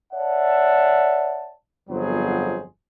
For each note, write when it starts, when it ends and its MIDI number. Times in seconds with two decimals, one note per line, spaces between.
0.13 1.52 73
0.13 1.52 74
0.13 1.52 76
0.13 1.52 78
0.13 1.52 81
1.88 2.62 31
1.88 2.62 41
1.88 2.62 54
1.88 2.62 59
1.88 2.62 68
1.88 2.62 72